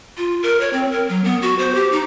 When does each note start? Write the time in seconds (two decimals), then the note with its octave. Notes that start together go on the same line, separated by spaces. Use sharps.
0.17 F4
0.43 A#4
0.61 C#5
0.73 C4
0.92 A#4
1.09 F#3
1.24 B3
1.42 F#4
1.59 C5
1.75 G4
1.92 D#4